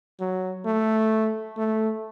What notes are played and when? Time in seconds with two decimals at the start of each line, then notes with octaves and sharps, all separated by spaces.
0.20 F#3
0.65 A3
1.57 A3